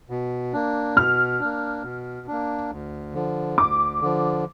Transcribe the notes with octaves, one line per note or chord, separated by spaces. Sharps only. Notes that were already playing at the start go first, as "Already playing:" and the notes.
B2
A#3 D4
B2 F6
A#3 D4
B2
A#3 D4
D2
D3 F3
D2 D6
D3 F3